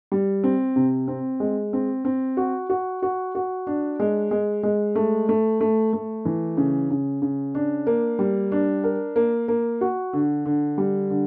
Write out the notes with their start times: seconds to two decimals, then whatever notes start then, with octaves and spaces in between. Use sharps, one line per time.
0.12 G3
0.44 C4
0.76 C3
1.08 C4
1.40 G#3
1.73 C4
2.05 C4
2.37 F#4
2.70 F#4
3.03 F#4
3.35 F#4
3.67 D4
4.00 G#3
4.31 G#3
4.63 G#3
4.95 A3
5.29 A3
5.61 A3
5.93 A3
6.25 E3
6.57 C#3
6.90 C#3
7.22 C#3
7.55 D4
7.87 A#3
8.19 G3
8.52 D4
8.84 A#4
9.16 A#3
9.48 A#3
9.81 F#4
10.13 D3
10.45 D3
10.78 G3
11.10 D3